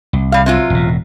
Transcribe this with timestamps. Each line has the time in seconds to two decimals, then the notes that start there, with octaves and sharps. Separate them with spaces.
0.13 C2
0.32 G3 F5
0.46 C3 F#3 F4
0.70 E1 A2